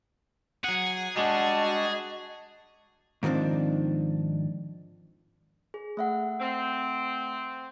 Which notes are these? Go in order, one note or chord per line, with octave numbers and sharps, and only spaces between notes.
F#3 G#4 F#5
G3 G#3 D4 F#4 D#5 A5
G#2 D#3 F3 C4 D4
G#4
A3 E5 F#5
C4